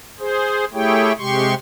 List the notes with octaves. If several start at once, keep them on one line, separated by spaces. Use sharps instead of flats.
G#4 C5
A3 E4 G4 G#4 C#5 G5
C3 G#3 G4 C6 C#6